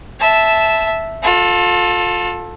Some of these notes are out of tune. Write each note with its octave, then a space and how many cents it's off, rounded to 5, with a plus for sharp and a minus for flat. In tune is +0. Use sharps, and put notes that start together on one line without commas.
E5 +0 A5 -10
F4 +30 A4 +0